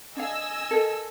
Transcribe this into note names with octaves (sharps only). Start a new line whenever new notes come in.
D4 D#5 F5 G#5 E6
A4 A#4